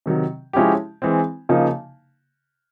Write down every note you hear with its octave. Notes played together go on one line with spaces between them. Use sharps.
C3 D#3 F#3
F3 G#3 C#4 E4 G4
E3 G#3 C4
C#3 F3 A#3 D#4